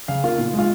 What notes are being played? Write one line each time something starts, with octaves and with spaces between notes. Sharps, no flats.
C#3 F5
A#3 F4
A#2
G#3 F4